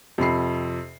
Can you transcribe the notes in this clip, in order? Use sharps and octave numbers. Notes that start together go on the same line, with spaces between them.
F2 C3 B5 C7